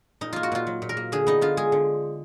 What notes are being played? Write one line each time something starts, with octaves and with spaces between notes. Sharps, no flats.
A#2 D#4
A#3 F4
F#4
A#2 F4
F#3
A#2
A#4
A#3
D3 G#4
B3 D#4
D3 F4
G#3 G#4
D3